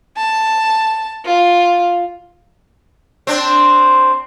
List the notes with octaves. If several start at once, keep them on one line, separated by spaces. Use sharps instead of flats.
A5
F4
C4 D4